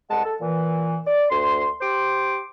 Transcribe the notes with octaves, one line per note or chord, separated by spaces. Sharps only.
C2 G#3 F#5 A5
A4
A#2 E3
D5
D2 C6
G4 C5 C6 D6